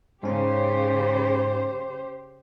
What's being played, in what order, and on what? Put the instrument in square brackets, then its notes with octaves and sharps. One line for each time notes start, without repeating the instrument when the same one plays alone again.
[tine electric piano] G#2 C#4 [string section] C#3 [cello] G4 C5